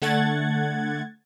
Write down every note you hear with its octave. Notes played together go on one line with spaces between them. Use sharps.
D3 A3 F#5 G#6 A6